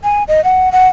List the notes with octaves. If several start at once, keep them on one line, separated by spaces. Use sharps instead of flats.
G#5
D#5
F#5
F#5